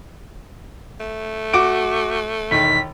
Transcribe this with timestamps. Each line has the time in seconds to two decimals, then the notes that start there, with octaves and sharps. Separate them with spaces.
1.00 A3
1.53 F#4 D6 D7
2.51 E1 D#3 B6